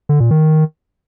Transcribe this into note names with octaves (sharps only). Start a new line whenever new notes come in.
D3
A#2
D#3